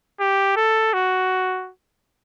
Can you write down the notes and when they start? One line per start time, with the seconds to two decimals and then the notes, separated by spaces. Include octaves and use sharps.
0.20 G4
0.56 A4
0.93 F#4